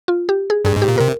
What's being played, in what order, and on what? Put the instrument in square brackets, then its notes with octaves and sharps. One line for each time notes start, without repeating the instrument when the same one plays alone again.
[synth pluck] F4
G4
G#4
[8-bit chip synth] G2 [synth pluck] G#4
[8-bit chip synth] G#2
[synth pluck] G4
[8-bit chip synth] A#2
[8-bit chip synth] C3 [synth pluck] A#4